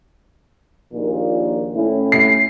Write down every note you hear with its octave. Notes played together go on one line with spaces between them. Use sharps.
A#1 D#2 A#2
A2 C#4 E4
C7